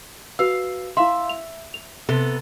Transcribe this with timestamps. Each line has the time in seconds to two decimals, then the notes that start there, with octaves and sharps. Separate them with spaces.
0.39 F#4 B4 F5 E6
0.97 E4 E5 F5 C6
1.29 F7
1.74 F7
2.09 C3 B3 A4